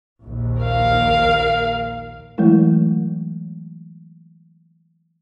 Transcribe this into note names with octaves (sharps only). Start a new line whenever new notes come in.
A#1 D#2
A#4 F5
E3 F#3 G#3 A3 E4 A#4